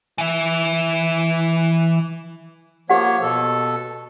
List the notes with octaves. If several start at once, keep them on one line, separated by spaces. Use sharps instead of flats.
E3 E5
F3 A#3 G4 C#5 F#5
B2 A4